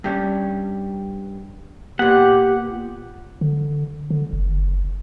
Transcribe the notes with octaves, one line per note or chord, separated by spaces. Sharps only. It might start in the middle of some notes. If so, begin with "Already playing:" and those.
G2 G3 C#4
A#2 B3 G4 F#5
D3
D3
F#1